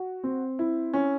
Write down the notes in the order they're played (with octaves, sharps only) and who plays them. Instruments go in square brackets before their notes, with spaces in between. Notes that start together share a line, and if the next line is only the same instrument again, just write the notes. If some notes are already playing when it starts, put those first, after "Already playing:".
Already playing: [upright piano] F#4
C4
E4
C#4